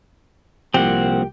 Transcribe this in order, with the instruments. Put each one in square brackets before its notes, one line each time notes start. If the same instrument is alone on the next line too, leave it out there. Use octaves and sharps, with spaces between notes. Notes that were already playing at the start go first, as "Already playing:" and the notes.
[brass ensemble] C2 [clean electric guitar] F3 A#3 [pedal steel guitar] C4 F#5 [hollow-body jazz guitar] G4